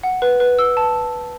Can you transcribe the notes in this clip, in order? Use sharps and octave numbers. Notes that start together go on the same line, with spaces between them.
F#5
B4
B4
E6
A5